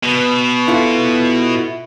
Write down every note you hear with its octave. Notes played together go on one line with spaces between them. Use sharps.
B2
E4 F4 A4